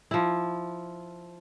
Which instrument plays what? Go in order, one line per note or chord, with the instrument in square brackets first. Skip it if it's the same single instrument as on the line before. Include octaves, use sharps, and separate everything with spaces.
[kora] F3 E4